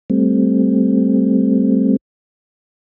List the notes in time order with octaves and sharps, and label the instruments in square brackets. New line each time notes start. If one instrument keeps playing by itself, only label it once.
[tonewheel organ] G3 A3 C4